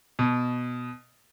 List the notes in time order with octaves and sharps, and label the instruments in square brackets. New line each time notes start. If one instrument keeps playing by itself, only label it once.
[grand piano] B2